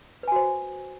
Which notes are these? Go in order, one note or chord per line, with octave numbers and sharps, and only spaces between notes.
F#4 B4 C5 G#5